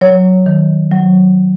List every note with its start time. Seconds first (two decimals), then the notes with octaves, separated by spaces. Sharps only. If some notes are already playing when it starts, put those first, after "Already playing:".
0.01 F#3 C#5
0.46 D#3
0.91 F#3